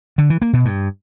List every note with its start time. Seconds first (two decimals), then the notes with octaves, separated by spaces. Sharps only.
0.18 D3
0.30 E3
0.42 A#3
0.53 B2
0.65 G2